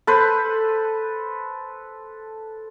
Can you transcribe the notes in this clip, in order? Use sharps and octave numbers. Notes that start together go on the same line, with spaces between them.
A4 B4 C5